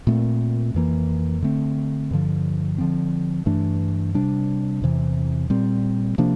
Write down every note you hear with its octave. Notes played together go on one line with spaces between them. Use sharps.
A#2 A3 C4
F2 E3 A#3
D3 A3 C4
G2 D3 F3
D3 F3 C4
G2 E3 A3 D4
C3 G3 D4
E2 C3 E3
A#2 G3 C4
C3 F3 A#3 D4